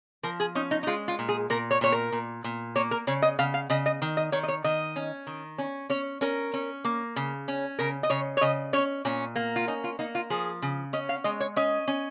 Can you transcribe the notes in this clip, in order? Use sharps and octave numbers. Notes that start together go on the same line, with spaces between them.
F3 A#4
G#4
C#4 D#4
D#4
D#4
G#3 F4
F4
A#2
G#4
A#2 A#4
C#5
A#2 C#5
A#4
A#2
A#2
A#3 C#5
A#4
C#3 C#5
D#5
C#3 F5
F5
C#3 D#5
D#5
D#3
D#5
D#3 C#5
D#5
C#5
D#3 D#5
C#4
D#3
C#4
C#4 C#5
C#4 A#4
C#4
A#3
C#3
C#4
C#3 A#4
D#5
C#3 C#5
C#5
C#3 D#5
C#4 C#5
A#2 C#4
A#3
F4
C#4 D#4
F4
A#3 D#4
F4
F3 G#4
C#3
C#4 D#5
F5
G#3 D#5
C#5
C#4 D#5
C#4